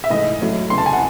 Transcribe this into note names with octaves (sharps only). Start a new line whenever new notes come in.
E5
G#2 E3 A3 D#5
A2 F#3 A3
E2 C#3 G#3 C6
A5
G#5
F#5